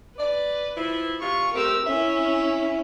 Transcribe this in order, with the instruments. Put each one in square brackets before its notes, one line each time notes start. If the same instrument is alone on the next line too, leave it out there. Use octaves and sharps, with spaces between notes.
[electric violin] B4 [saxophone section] D5
[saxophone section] F3 E4
[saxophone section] C3 F4 [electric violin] C#6
[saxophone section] A3 C4 G4 [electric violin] A#4 E6
[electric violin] C#4 E4 [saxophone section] E5